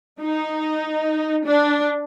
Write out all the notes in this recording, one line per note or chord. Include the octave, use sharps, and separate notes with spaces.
D#4
D4